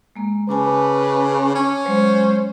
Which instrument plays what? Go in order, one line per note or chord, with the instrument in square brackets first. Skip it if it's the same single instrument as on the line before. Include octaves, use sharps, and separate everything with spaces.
[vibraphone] G#3 A#3
[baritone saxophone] C#3 [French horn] B4 [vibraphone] G#5 A5 D6
[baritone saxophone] C#4
[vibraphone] F#3 G#3 [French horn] C5